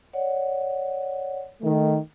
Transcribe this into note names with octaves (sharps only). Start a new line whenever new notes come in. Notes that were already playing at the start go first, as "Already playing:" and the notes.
C#5 D5 F#5
D#3 A3